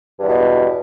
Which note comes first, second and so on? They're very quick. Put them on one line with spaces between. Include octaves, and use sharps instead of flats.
G2 E2 B2